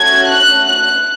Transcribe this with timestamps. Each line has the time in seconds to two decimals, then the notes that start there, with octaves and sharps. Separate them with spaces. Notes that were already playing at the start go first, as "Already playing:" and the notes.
Already playing: A3 C#4 F#4 G#6
0.25 F#6
0.66 F#6